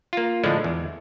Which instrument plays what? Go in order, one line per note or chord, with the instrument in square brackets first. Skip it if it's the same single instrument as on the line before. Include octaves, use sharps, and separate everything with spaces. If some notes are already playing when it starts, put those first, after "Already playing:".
[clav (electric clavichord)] A#3 F4
A2 D3 F3 G#3 D4
E2